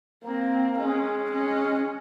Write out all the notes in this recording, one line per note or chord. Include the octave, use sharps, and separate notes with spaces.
A#3 C4
G#3 C#4
C#4